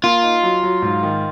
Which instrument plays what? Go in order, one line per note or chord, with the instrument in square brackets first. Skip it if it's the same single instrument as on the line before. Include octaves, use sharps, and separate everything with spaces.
[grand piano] A#3 [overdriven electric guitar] F4
[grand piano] D#4
F#3
F#3
G#2
D#3